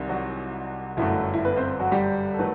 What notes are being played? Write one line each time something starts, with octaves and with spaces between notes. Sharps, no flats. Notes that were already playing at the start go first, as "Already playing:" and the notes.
Already playing: C2 C3 D#3 G3
F#3 F#4
G1 F#2 F#3 A3 E4
E4
B3 B4
C4 C5
F#3 F#4
G3 G4
A4
D#3 F#3 A3 B4